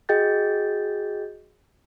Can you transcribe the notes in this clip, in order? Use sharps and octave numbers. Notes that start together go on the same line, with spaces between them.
F#4 G#4 D#5 G5 G6 A6